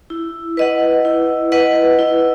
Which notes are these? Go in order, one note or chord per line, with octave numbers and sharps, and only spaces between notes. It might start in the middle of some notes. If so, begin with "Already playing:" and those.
E4
B4 D#5 F#5
E4
B4 D#5 F#5
E4